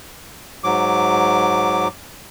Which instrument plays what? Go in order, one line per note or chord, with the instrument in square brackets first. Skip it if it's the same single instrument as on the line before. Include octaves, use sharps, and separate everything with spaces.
[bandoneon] G#2 F#3 D6